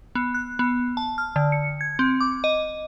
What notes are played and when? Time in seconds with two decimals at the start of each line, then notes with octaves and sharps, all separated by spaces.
0.15 B3
0.34 F#6
0.59 B3
0.97 A5
1.18 F6
1.36 D3
1.52 C#7
1.81 G#6
1.99 C4
2.21 D6
2.44 D#5